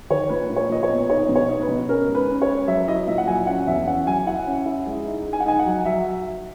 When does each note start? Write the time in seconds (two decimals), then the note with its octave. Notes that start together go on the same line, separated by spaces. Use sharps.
0.10 D#3 C#5
0.29 A#2 B4
0.50 A#2
0.56 C#5
0.69 A#2 D#5
0.83 C#5
0.90 B3
1.10 D#4 C#5
1.29 B2
1.35 C#5
1.49 D#4
1.62 B4
1.69 B2
1.89 C#4 A#4
2.08 G#2
2.15 B4
2.28 C#4
2.42 C#5
2.48 C#4
2.67 F#3 E5
2.88 E4 D#5
3.07 A#2 E5
3.18 F#5
3.27 F#3 G#5
3.47 C#4 F#5
3.67 E2 E5
3.87 C#4 F#5
4.06 F#3 G#5
4.27 E4 F#5
4.46 C#4
4.66 E4
4.87 G#3
5.05 D#4
5.25 D#4
5.33 G#5
5.40 F#5
5.46 D#4 G#5
5.59 F#5
5.66 F#3
5.85 F#3 E5